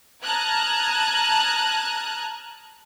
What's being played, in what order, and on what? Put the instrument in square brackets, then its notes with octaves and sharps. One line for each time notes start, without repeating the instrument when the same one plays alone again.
[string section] A5 A#5 D#6 F6 F#6 G#6